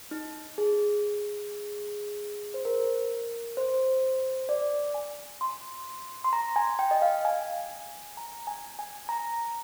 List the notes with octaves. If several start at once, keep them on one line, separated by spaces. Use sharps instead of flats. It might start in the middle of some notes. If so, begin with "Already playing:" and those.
D#4
G#4
C5
A#4
C5
D5
G#5
C6
C6
A#5
G#5
G5
D#5
F5
G#5
A#5
G#5
G#5
A#5